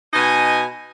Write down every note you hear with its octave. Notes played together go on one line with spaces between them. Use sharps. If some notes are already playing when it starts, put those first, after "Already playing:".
B2 D#4 D#5 G#5